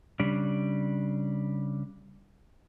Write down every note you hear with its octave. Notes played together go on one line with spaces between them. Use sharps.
C#3 G3 D4